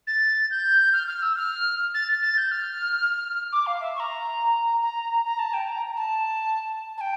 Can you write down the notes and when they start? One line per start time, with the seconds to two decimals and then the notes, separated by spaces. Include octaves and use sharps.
0.07 A6
0.50 G6
0.93 F6
1.07 F6
1.22 E6
1.36 F6
1.94 A6
2.22 A6
2.37 G6
2.51 F6
3.52 D6
3.66 F5
3.81 E5
3.95 C#6
4.00 A#5
4.82 A#5
5.25 A#5
5.39 A5
5.53 G5
5.68 A#5
5.97 A5
6.97 A5
7.01 G5